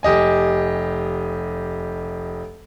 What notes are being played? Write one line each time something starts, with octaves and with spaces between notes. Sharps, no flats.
F1 G4 D#5 G#5